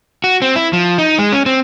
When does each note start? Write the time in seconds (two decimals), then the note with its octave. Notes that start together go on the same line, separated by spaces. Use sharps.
0.24 F#4
0.42 C4
0.56 E4
0.73 F3
0.98 D#4
1.19 G#3
1.32 C#4
1.46 C4